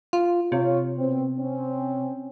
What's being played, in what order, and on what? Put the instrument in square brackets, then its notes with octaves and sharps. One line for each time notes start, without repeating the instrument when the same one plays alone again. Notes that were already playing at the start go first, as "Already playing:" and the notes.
[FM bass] F4
[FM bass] C3 [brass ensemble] F4 C#5
[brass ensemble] B2 C4
C4 C#4